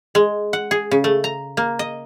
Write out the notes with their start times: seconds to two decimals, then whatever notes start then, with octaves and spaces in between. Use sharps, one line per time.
0.15 G#3
0.53 F#5
0.71 G#4
0.91 C#3
1.04 A3
1.24 A#5
1.57 A#3
1.79 D#5